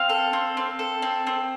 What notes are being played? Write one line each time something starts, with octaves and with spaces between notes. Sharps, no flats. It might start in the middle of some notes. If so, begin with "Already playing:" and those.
Already playing: C4 F5
A4
C4
C4
A4
C4
C4